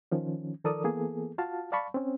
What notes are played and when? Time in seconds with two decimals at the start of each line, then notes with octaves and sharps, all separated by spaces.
0.12 D#3 F3 C#4
0.64 D#3 F3 A4 A#4 D5 D#6
0.84 E3 A#3 B3 G#4 A4
1.38 F4 F#4 F5 A5
1.72 D5 F5 A5 B5 C#6
1.94 C4 C#4